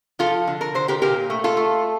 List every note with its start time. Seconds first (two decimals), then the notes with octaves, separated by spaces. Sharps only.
0.19 F3 F4 A4
0.47 D3
0.61 A#4
0.75 D3 C5
0.88 G4 A#4
1.02 A#2 G4 A#4
1.30 A3
1.44 F4 A4
1.57 A3